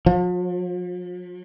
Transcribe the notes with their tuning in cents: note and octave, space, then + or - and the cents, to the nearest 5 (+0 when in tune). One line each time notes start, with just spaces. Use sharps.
F3 +45